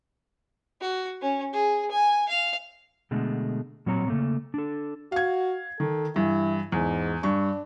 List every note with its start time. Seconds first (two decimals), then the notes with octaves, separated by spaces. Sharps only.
0.81 F#4
1.21 C#4
1.53 G#4
1.91 G#5
2.28 F5
3.11 B2 D3 G#3 A3
3.86 A#2 F#3 C4 C#5 A#5
4.08 C#3 A3 A#3
4.54 D4 A4
5.12 F#4 F5 G#6
5.80 D#3 A4
6.16 G2 E3 E4
6.72 E2 G#2
7.23 G2 D4 C#6